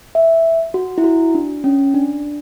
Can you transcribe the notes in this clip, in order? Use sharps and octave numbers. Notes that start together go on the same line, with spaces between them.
E5
F#4
E4
F#4
D4
C#4
D4